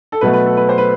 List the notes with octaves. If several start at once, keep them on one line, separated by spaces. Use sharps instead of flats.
A4
B2 F#3 A3 B4
B4
A4
B4
C5
B4